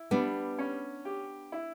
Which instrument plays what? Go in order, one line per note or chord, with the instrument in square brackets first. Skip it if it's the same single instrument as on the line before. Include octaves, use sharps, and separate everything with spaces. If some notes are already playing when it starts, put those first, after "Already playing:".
Already playing: [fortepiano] E4
[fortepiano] G3 [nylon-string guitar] B3 D4
[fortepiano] C#4
G4
E4